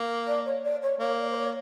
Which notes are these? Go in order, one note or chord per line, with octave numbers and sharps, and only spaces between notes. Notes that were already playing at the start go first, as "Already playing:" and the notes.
Already playing: A#3
D5
C#5
D5
C#5
A#3 C#5
D5
C5
C#5